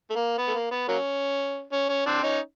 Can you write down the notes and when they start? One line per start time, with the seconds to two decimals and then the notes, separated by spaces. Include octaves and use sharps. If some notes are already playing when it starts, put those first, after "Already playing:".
0.10 A3
0.15 A#3
0.38 B3
0.48 A3
0.54 A#3
0.71 B3
0.88 F#3 A#3 C#4
1.72 C#4
1.89 C#4
2.06 C4 D4
2.23 C#4 D#4